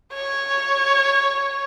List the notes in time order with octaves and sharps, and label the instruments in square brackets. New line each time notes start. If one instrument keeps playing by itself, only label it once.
[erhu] C#5